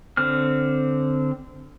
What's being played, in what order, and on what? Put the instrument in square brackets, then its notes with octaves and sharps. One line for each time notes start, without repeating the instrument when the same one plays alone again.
[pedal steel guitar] D3 C4 F6